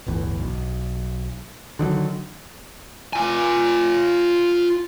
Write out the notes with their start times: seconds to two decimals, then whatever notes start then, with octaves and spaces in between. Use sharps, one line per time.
0.06 D1 G1 E2
0.40 B1
1.79 D3 D#3 F#3
3.13 F4 G#5